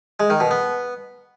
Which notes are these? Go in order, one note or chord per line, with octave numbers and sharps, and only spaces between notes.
G#3
D#3
B2
B3